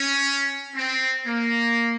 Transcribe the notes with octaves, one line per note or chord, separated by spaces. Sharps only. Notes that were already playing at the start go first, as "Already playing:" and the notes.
Already playing: C#4
C4
A#3